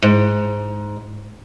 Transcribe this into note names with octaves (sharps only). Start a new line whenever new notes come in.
G#2